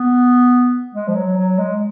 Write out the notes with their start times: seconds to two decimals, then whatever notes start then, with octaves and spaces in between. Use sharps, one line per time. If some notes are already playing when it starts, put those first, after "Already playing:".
Already playing: B3
0.94 G#3
1.08 F3
1.15 F#3
1.37 F#3
1.58 G#3